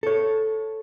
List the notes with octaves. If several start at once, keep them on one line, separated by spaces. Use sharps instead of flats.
A4 C#5